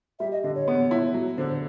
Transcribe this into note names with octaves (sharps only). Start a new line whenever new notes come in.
G3 E5
D#5
D3 D#5
C#5
B3
E4
F#3
D3 C5